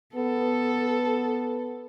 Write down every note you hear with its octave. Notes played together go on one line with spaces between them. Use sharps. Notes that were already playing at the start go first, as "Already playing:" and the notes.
B3 A4